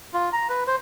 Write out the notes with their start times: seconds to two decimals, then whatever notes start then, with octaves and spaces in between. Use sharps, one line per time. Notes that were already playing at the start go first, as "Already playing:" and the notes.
0.14 F4
0.33 A#5
0.49 B4
0.67 C5